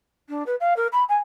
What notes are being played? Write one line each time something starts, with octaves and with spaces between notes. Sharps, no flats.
D4
B4
F5
A#4
B5
G#5